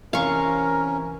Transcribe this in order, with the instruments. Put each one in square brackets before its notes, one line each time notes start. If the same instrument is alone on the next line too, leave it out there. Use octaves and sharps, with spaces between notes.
[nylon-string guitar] C3 E3 C4 [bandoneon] C#4 [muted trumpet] A#4 [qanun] F5 C#6